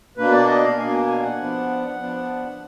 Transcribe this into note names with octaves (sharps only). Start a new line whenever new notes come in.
B2 A#3 D4 B4
D5
D#5
F5
B2 A#3 D4 G#5
G#5
F#5
F3 B3 D4
F3 B3 D4